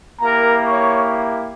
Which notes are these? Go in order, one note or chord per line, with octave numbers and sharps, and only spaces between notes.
A#3 E4 G4 A#4 A#5
C#5 C#6